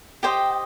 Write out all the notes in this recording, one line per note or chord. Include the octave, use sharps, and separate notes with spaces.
G4 C5 D#5 G5